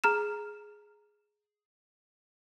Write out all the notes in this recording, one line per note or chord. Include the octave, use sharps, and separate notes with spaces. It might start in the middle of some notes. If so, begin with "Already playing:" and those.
G#4 A#5 F6 E7